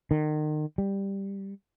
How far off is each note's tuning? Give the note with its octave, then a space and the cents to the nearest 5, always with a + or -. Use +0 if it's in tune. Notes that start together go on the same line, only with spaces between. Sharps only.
D#3 -35
G3 +5